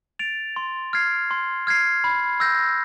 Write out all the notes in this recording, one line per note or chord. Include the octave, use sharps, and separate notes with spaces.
A6 D7 F7
C6
F6 G#6 C7
C6
F6 G#6 C7
B5
E6 G6 A#6